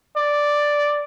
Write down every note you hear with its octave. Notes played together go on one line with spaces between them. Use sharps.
D5